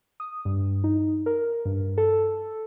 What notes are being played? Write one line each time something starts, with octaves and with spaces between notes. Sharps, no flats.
D#6
G2
D#4
A#4
G2
A4